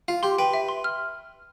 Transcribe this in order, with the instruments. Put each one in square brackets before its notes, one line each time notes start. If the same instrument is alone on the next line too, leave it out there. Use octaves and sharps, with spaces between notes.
[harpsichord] F4 [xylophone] F5
[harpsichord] G4 [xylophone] C6
[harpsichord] B4 [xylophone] G5
[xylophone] E5
C6
F6